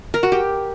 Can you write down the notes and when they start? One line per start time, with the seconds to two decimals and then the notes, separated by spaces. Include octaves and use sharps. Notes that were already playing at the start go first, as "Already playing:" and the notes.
0.14 A#4
0.23 F#4
0.32 G4